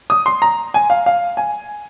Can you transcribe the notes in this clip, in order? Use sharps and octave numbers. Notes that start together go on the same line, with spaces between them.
D#6
C6
A#5
G#5
F5
F5
G#5